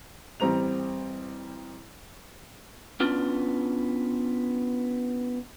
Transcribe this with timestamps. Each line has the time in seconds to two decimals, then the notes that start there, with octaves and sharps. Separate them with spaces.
0.40 A1 G3 C4 A#5 F7
3.00 B3 C#4 D4 F4